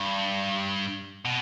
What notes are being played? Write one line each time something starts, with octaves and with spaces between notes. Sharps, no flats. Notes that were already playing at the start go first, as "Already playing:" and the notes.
Already playing: G2
B2